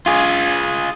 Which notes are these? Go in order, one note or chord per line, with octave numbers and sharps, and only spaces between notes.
F4 G#4